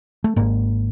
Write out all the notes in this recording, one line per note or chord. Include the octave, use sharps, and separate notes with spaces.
A3
G#1 G#2 A#3